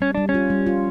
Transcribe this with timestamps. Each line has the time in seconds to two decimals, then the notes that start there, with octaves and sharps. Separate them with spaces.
0.01 G3 C#4
0.15 G3 D4
0.29 C#4
0.34 F4
0.50 G3
0.67 F4